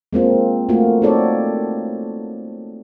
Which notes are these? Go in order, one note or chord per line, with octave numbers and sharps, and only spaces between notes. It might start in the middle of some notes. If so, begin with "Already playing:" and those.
G#3 A#3 C4 F4
A3 A#3 F4 F#4
C4 D#4 F#4 A4 C#5 D5